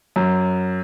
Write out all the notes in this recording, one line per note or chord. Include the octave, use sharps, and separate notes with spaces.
F#2